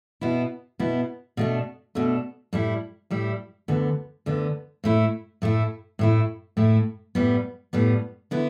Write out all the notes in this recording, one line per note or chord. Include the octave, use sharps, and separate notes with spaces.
B2 B3 E4
B2 B3 E4
B2 A3 D4
B2 A3 D4
A2 G3 E4
A2 G3 E4
D2 D3 B3
D2 D3 B3
A2 A3 E4
A2 A3 E4
A2 A3 E4
A2 A3 E4
A2 G3 B3
A2 G3 B3
D3 B3 E4